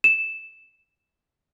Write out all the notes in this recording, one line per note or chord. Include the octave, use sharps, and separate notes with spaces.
E7